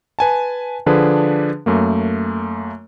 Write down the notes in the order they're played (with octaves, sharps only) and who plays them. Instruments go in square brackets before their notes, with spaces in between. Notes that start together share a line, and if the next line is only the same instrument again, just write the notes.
[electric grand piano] B4 G#5 A5
D3 F3 D4 G#4 B4
F#2 A3 A#3